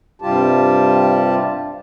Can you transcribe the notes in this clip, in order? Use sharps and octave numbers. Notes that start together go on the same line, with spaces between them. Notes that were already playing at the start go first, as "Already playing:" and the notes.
G2 C3 G3 F4 G4 A5